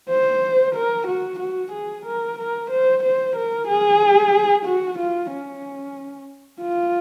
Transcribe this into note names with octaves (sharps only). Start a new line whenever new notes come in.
C5
A#4
F#4
F#4
G#4
A#4
A#4
C5
C5
A#4
G#4
F#4
F4
C#4
F4